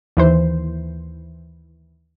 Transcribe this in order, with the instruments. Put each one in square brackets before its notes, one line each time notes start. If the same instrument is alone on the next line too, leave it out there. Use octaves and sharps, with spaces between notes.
[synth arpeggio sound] D#2 E3 C5